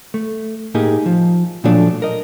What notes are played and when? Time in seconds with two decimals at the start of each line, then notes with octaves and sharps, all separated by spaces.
0.14 A3
0.75 A2 A#3 D#4 G4 G#4
1.06 F3
1.64 A#2 F3 F#3 A3 D4
2.02 A#4 D#5